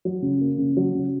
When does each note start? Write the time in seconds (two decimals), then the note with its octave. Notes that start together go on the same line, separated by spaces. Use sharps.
0.05 F#3
0.22 C#3
0.40 A#3
0.58 C#3
0.77 F#3
0.95 C#3